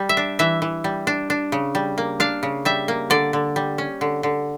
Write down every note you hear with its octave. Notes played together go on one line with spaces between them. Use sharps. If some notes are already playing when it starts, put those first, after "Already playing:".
Already playing: G3
E5
D4
E3 E5
E3
G3
D4
D4
C#3
G3
A#3
D4 F5
C#3
G3 E5
A#3
D3 D5
D3
G3
C#4
D3
D3